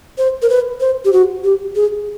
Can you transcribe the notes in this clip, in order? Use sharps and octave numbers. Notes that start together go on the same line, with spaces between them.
C5
A#4
B4
C5
G4
F#4
G4
G#4